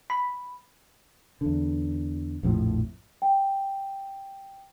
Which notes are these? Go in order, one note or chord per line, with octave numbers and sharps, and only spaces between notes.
B5
E2 D3
A#1 F2 A2 F3
G5